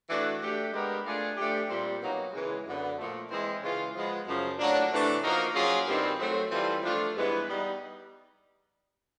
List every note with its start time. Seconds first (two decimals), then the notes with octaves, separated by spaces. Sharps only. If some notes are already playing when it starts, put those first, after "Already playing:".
0.09 E3 A3 D4 F#4
0.41 A3 D4 G4
0.73 G#3 B3 D4 G4 A#4
1.05 A3 D4 F4 G#4
1.37 F3 A3 D4 G4
1.69 A#2 G3 C4
2.01 B2 F#3 A#3 D#4 G4
2.33 C#3 E3 G#3
2.65 F#2 D3 F#3 B3
2.97 A#2 F3 A3
3.30 E3 G#3 C4 E4
3.62 C#3 E3 G#3 C#4 F4
3.94 F3 G#3 B3
4.25 F#2 C#3 F3
4.57 A2 F#3 A#3 D4
4.91 C3 E3 A3 D4
5.22 F3 A#3 D#4 F#4 A#4
5.54 F#3 A#3 C#4 F4 G#4
5.87 G2 D#3 G3 C4
6.19 F#3 A3 C4
6.50 E3 G3 C4 F4 A4
6.83 F3 A3 D4 F4
7.15 G2 E3 G#3 B3 E4
7.47 G3 B3 D#4